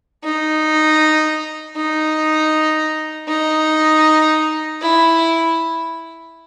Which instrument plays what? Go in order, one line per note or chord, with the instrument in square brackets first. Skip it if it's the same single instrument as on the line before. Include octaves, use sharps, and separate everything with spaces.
[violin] D#4
D#4
D#4
E4